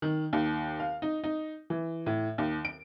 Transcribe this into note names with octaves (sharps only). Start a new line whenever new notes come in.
D#3
D#2
F5
D#4
D#4
E3
A2
D#2
D7